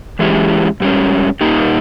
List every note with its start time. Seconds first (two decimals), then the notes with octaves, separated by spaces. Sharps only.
0.19 E3 G#3 C#4 E4 G4
0.80 G#2 G3 C#4
1.41 A#2 A#3 D#4 G4